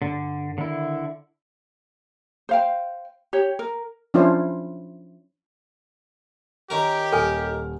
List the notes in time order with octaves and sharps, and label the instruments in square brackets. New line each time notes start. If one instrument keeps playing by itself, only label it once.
[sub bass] G2 [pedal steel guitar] D3
[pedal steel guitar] D3 E4 [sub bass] D#3
[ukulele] C5 F5 G5
G4 C#5
A#4
[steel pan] F3 C#4 D4 E4 F4 C5
[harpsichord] D#3 C#4 A#4 [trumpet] G4
[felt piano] D#1 F6 [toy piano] A4 G#5